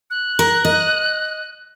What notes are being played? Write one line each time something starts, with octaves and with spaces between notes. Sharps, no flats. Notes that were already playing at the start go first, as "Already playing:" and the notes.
F#6
A#4
D#5